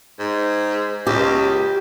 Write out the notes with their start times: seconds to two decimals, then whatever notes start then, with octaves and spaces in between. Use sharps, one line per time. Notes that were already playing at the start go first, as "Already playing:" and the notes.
0.20 G#2
1.07 C#2 G4